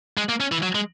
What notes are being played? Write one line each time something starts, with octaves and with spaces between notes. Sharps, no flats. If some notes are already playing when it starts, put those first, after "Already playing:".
G#3
A#3
C#4
E3
F#3
G#3